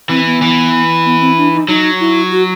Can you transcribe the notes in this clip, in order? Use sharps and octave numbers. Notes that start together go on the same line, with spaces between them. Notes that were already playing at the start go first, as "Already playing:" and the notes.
E3 C4
B3
E3
B3
C4
D4
D#4
F#3 D#4
E4
F#4